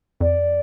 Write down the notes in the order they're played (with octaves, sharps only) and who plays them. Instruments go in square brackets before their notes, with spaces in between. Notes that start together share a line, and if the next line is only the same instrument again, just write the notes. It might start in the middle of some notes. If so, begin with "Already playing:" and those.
[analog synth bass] F2 [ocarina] D5